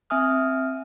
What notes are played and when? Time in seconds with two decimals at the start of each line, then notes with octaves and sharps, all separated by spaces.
0.10 C4 E5 G#5 D#6 F6